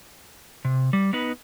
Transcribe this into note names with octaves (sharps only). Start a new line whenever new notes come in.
C3
G3
B3 D#4 B4